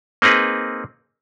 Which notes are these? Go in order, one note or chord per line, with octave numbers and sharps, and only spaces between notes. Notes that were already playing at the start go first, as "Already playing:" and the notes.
A#3 C4 D#4 G#4 B4